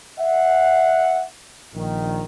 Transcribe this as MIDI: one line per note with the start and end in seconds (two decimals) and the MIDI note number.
0.19 1.24 76
0.19 1.24 78
1.74 2.24 34
1.74 2.24 51